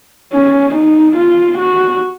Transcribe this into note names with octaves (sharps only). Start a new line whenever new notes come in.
C#4
D#4
F4
F#4